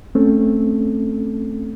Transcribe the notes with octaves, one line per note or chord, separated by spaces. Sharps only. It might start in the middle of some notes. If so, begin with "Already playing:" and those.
A3 C4 C#4 A4